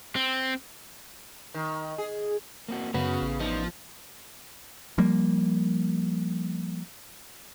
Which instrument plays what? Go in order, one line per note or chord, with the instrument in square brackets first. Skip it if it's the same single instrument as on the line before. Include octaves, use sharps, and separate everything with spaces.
[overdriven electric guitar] C4
[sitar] D#3
G#4
[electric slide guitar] A#3 C4 F#4
[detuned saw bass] F#2 [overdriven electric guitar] C#3 [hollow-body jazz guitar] B3 [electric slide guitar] F#4
[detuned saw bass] A1
[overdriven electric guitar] F3 [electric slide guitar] C#4 D#4
[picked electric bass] F3 G3 A#3